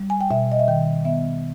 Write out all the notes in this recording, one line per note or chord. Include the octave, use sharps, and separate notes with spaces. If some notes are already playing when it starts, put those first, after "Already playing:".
Already playing: G3
G#5
G5
B2 E5
D#5
E5
D#3 G5
B3 E5